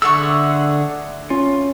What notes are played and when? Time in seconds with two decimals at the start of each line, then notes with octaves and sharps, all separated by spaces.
0.02 D3 A3 G#4 F#5 C#6 E6
1.30 C#4 F4